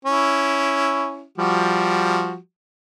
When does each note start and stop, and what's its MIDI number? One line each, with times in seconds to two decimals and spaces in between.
0.05 1.26 61
0.05 1.26 64
1.38 2.37 53
1.38 2.37 55
1.38 2.37 66